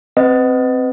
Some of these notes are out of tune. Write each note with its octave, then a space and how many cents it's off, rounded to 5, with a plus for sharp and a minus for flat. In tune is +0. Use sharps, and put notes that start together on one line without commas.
C4 +0 B4 +30 D#5 +0